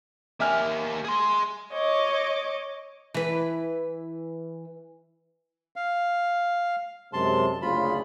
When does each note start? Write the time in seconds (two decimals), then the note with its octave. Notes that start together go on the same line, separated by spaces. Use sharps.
0.40 A#3 G4 E5 G#5 F6
1.04 G#4 C6
1.72 C#5 D#5 D6
3.14 E3 B4
5.76 F5
7.13 F#2 C3 G#3 A5 C6
7.62 F#1 D2 C#3 F4 B5